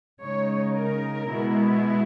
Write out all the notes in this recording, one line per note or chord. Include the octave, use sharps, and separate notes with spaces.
C#3 G#3 D#4 C#5
A#4
B2 G#3 B3 E4